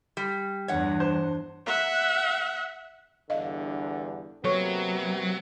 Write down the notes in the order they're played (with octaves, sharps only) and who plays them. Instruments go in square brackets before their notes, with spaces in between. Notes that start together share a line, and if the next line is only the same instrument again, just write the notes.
[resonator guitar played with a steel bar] G3
[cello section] E2 G2 [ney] D4 [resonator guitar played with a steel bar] C#5 F#5
[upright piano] C5
[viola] E5 F#5
[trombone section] E2 G2 D3 [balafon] D#5 F5
[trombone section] C3 A#3 B3 [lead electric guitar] F#3 [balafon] A4 C#5 C#6